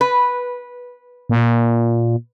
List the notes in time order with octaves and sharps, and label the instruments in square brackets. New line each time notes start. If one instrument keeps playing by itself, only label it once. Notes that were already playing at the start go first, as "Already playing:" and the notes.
[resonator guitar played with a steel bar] B4
[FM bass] A#2